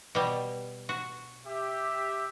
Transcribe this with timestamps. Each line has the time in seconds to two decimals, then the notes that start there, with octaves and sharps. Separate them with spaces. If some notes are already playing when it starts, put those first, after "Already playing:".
0.15 B2 G3
0.89 F#4
1.47 G4 E5